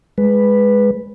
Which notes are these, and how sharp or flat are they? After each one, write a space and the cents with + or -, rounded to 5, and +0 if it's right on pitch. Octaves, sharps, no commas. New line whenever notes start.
G#3 +0 B4 +0